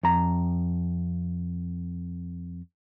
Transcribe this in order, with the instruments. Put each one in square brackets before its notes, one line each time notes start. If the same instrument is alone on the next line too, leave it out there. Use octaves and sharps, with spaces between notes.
[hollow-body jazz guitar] F2 A#5